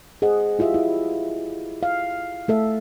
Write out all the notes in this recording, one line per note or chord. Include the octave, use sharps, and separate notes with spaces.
G#4 C5 D#5 F#5
E4 F4 G4 E5
E4
F5
A3 A4 E5